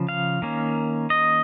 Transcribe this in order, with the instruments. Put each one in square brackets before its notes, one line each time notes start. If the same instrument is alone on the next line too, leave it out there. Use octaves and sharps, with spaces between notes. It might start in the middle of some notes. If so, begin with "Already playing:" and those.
Already playing: [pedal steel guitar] C#3 F3
F5
D#3 A#3 C#4
D#5